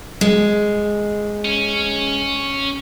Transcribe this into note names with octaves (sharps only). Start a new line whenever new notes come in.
G#3
C#4